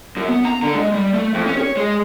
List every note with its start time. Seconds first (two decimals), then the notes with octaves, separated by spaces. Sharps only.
0.17 F#2
0.29 B3
0.45 A#5
0.63 D3
0.75 G#3
0.94 G3
1.14 A3
1.34 F2
1.46 C#4
1.58 C#5
1.77 G#3